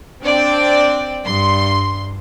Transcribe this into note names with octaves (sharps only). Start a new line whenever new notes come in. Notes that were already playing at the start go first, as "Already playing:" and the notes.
C4 D4 D5 G5
G2 C6